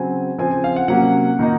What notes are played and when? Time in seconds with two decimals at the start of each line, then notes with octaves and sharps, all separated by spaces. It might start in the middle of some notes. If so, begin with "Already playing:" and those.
Already playing: C#3 F#3 C4 G#5
0.38 C#3 F3 C4 G#5
0.51 G#5
0.64 F5
0.76 F#5
0.88 C3 F#3 A#3 C#4 F#5
1.39 D#3 A#3 D#4